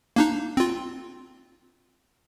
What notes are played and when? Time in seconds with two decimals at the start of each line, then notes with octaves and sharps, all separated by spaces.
0.16 A#3 D4 D#4
0.57 C4 F4